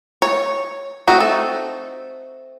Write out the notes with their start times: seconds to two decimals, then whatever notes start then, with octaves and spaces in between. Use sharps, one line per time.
0.22 C#5
1.07 A3 C4 D#4 F#4
1.20 A4